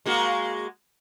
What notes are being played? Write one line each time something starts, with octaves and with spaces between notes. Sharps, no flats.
G#3 A#3 F#4